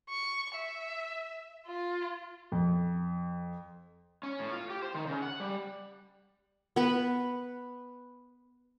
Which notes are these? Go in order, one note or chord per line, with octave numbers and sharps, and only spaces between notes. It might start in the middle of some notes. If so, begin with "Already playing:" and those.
C#6
E5
F4
F2
C#4
A2
F4
G4
C5
D#3
C#3
F#5
G3
B3 B4